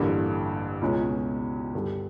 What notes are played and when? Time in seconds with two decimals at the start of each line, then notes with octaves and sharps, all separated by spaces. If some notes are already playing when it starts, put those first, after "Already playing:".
Already playing: A1 G2 D3 G3 A#3
0.81 C#2 B2 G#3 C#4
1.74 G2 D3 G3